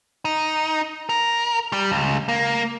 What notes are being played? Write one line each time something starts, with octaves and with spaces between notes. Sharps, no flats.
D#4
A#4
G3
C#2
A#3